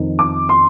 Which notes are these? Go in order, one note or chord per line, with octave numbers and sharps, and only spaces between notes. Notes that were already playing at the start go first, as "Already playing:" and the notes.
Already playing: F2 D#3
D6
C6